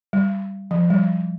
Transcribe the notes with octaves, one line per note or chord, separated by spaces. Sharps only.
G3
F3
G3